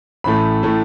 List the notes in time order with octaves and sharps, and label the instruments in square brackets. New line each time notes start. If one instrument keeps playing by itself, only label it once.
[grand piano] A1 A2 A3 B5
A2 A3